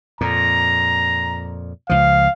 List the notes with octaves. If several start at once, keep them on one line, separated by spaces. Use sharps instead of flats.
F2 A#2 A#5
C#2 F3 F5